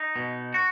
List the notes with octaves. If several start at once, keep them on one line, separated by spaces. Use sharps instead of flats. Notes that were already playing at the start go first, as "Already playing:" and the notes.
Already playing: D#4
B2
F#4